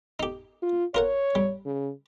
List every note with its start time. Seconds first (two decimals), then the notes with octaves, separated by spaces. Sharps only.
0.20 D#4 G4
0.62 F4
0.95 F4 A#4 C#5 F#5
1.35 G3
1.66 C#3